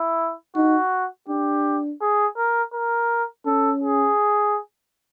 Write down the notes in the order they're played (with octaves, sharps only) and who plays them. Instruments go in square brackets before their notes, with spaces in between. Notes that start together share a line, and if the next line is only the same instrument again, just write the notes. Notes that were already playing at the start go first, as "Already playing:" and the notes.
Already playing: [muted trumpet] E4
[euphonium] D#4 [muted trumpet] F#4
[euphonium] D4 [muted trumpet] G4
[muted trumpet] G#4
A#4
A#4
[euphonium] C#4 [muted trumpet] A4
[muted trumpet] G#4